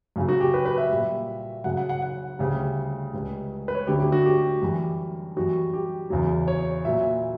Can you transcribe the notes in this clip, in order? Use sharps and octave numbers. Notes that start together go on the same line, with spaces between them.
F#2 C#3 F#3
F#4
G4
B4
B4
E5
A#2 G3
F#2 C#3 F#3 F#5
F#5
F#5
F#5
D2 C#3 G3
C#2 C#3 G3
B4
C#5
D2 D3 F#3 G4
G4
F#4
G4
F#2 E3 G3
F#2 E3 G3 F#4
G4
E2 C#3 F#3
C#5
A#2 F#3 E5